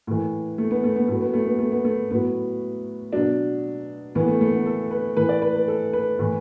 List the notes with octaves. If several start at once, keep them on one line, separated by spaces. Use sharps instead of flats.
A2 E3
A3
B3
A3
B3
A2 F#3 A3
B3
A3
B3
A3
B3
A3
A2 F#3 B3
B2 F#3 D4
A2 E3 B3
A3
A3
B3
A4
B4
A2 E3 B4
D5
B4
B4
A4
B4
A2 E3